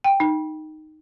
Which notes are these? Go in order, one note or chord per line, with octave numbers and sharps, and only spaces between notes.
G5
D#4